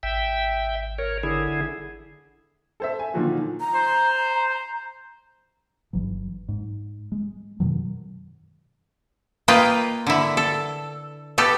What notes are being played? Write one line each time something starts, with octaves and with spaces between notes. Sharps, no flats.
G#1 E5 G5
A#4 C#5
D3 E4 G#4
A4 C5 E5
G#5
A#2 D3 D#3 F3 F#3 F#4
A#5
C5
G1 E3 F#3
G#2
G#3
F#2 B2 D#3 F#3
A#3 F4 B4 D#5 G5
D3 E4
A4
B3 G4 A4